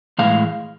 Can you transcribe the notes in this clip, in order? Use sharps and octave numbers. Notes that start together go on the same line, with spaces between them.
A2 E3 G#3 F5